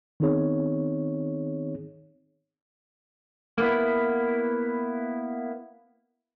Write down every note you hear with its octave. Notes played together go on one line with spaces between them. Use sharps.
D#3 B3 C4 D#4 G#4 C#5
A#3 B3 E4